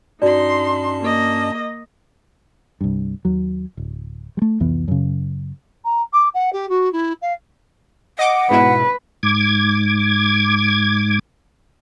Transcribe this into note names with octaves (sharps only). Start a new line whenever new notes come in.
G2 C#4 D#4 F#4 D5 A5 C6
A#3 D#5
C2 G2
D#2 F#3
D1
G3 A3
C2 F2 E3 B3
F#2 C#3
A#5
D6
F#5
G4
F#4
E4
F5
D#5 F#5 D6
G#2 B2 E4 B4
G#2 D6 G#6